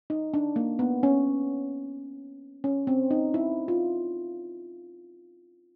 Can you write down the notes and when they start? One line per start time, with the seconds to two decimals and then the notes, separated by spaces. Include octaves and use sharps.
0.10 D#4
0.34 D4
0.56 A#3
0.79 B3
1.03 C#4
2.64 C#4
2.87 C4
3.11 D#4
3.34 E4
3.68 F4